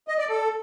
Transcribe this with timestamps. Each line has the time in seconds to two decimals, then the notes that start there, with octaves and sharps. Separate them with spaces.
0.08 D#5
0.18 D5
0.29 A4